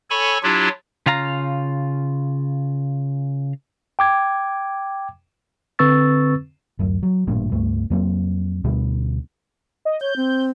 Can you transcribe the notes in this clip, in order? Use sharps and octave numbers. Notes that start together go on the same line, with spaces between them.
A4 C#5 G#5 B5 C#6
F#3 D4 E4 F4 G4
C#3 F4 F5 A#5
G5 D6 G#6
D3 C4 B4 C#6 E6 A6
D1 F#2
F#3
A1 G2 A#2
C#2 G2 A3
F2 F#3 A#3 C4
D2 B2 D3 G3
D#5
C#5 G6
C4